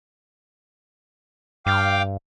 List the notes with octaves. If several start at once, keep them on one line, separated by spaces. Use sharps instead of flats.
G2 F5 G5 D6